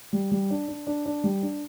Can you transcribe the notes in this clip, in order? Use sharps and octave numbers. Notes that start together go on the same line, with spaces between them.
G3
G3
D4
D4
D4
D4
G3
D4